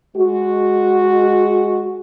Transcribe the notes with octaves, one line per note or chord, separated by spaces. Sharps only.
G#3 F#4